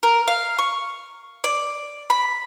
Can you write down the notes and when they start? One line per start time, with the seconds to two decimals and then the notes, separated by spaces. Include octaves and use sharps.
0.03 A#4
0.28 F5
0.59 C#6
1.44 D5
2.10 B5